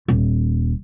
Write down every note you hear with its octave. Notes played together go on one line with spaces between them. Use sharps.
D#1